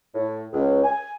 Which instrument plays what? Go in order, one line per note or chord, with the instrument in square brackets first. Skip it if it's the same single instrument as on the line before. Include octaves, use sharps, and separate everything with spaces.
[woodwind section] A2
C#2
G#5